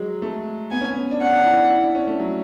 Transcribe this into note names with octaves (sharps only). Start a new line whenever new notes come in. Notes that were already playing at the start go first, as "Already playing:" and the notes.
Already playing: F#3 G#3
A3
B3 G#5
C#4
B3
D4
C#4 F#5
D4
E4
D4
E4
D4
C#4
A3
F#3